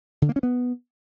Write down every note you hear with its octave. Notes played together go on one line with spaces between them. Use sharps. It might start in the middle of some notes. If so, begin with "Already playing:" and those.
D3
A#3
C#4
B3